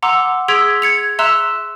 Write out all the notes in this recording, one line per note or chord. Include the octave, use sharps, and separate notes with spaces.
F#5 A#5 C6 D6 E6
G#4 C6 E6 G#6 B6 D7
G#6 C#7 F7
E5 A#5 C6 E6 F#6 E7